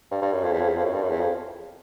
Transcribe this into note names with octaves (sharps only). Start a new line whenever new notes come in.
G2
G2
F#2
F2
E2
F2
E2
F2
F#2
G2
F#2
E2
F2